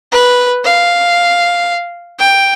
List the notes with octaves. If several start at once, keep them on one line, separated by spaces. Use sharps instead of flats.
B4
F5
G5